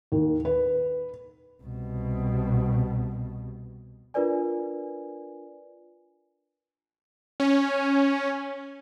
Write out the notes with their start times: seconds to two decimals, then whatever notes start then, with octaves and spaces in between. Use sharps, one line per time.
0.12 D#2
0.45 B4
1.63 C2 B2
4.14 D4 F4 A#4 B4 D5 G#5
7.40 C#4